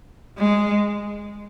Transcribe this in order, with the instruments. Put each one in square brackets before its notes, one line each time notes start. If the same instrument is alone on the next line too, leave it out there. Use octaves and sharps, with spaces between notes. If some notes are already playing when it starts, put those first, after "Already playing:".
[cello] G#3